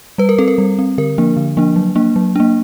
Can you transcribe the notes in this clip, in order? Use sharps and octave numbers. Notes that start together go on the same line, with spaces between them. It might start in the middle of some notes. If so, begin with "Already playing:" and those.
G3 B4
A#4
C4 A4
A#4
G3
C4
D3 A#4
F3 A#3 D4
D3
F3 A#3 D4
F#3
A#3 D4
F#3
A#3 D4